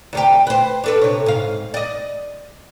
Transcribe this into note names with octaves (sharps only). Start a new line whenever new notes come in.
D2 C3 G4
B4 C5
D4 A4 B4
C3 C#5
G#2 F5
D5 D#5